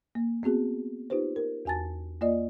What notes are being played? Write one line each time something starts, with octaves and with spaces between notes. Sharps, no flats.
A#3
B3 C4 F#4 G#4
D#4 F4 G4 B4 C5
A#4
E2 F#4 G#5 A5 A6
A#3 F4 D5 D#5